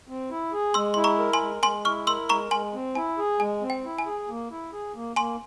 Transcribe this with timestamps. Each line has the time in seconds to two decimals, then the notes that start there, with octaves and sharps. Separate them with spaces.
0.08 C4
0.30 E4
0.52 G#4
0.74 G#3 C6 E6
0.94 E4 C6
1.04 A#5 C#6
1.19 A#4
1.33 G#5 C6
1.41 G#3
1.63 G#3 G#5 C6
1.85 E4 C#6 F6
2.07 A#4 C6 E6
2.29 G#3 A#5 C#6
2.51 G#3 G#5 C6
2.73 C4
2.95 E4 G#5
3.18 G#4
3.40 G#3 G#5
3.61 C4
3.70 G5
3.84 E4
3.98 G#5
4.06 G#4
4.28 A#3
4.51 E4
4.73 G#4
4.94 A#3
5.16 A#3 G#5 C6